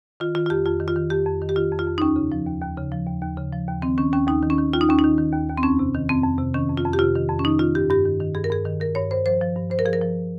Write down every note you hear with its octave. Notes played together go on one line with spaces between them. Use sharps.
D#3 F4
D#3 F4
F4
F2 G4
F2 F4
D#3
F4
D#3
F2 G4
F2
D#3
G4
D#3 F4
F2
F4
F2
D#4
D#2 C#4
C#3
F3
D#2
D#2
C#3
F3
D#2
D#2
C#3
F3
D#2
D#3 C4
D#3 C#4
D#2 C#4
D#2 D#4
D#3
C#4
D#3
D#2 F4
D#4
D#2 C#4
D#4
D#3
D#3
D#2
D#2
C4
F2 C#4
C3
D#3
F2 C4
F2
C3
D#3 C#4
F2
F4
F2
G4
C3 F4
D#3
F2
C#4
D#3 D#4
D#3 F4
G2 G4
G2 G4
D#3
D#3
G2 G#4
A#4
G2 G#4
D#3
D#3 A#4
G2 C#5
G2 C5
F3 C5
F3
G2
G2 C5
A#4
F3 G#4
A#4
F3